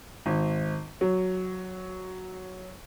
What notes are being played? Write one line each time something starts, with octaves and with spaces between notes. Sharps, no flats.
G#1
F#3